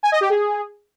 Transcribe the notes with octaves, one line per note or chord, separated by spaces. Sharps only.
G#5
D#5
G4
G#4